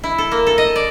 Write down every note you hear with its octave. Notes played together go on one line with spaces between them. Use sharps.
E4
A4
A#3
A4
D#5
D5